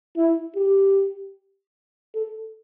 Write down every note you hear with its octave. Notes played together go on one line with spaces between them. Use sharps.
E4
G4
A4